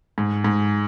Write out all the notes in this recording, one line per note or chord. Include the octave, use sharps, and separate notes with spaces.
G#2
G#2